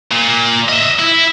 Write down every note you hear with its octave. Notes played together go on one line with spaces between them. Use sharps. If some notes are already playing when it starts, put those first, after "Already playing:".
A#2
D#5 E5
E4